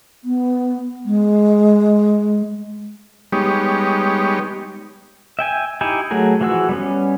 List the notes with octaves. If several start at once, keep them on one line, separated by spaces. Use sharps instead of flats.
B3
G#3
G3 G#3 B3 D#4 G4 C#5
E5 G5 G#5
D#4 E4 G4 G#5
F#3 A3 G#4 A#4
E3 F3 F#4 G#4 E6
G3 B3 C#4